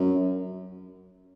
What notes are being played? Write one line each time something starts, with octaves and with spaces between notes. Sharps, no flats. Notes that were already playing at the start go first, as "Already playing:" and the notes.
Already playing: F#2